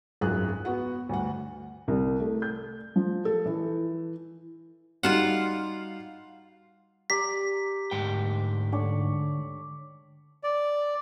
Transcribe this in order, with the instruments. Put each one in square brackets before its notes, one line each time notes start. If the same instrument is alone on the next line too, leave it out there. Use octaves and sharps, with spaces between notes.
[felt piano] G#1 C#2 F#2 G#4 F#6
B3 F#4 F#5
D2 G2 F#5
C2
A3
G6
F3
A4
E3
[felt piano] G3 D#4 F#4 [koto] F4 F5 F#5
[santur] G4 D5 A#5 [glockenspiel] B6
[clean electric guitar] D2 G#2 G5 [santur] C6
[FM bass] D3 [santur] C#5 D5 A5
[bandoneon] D5